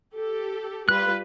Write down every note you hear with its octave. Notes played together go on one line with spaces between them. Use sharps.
G4 A4
G3 F4 B4 F#6